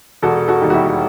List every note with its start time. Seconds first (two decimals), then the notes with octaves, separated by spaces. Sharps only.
0.22 E1 F#4 A4
0.48 F#4 A4
0.61 D#2 D#3 G3
0.70 F#4
0.74 E4 G4